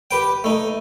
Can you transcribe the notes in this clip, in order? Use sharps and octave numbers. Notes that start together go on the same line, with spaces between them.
G4 B4 G5
A3 D#4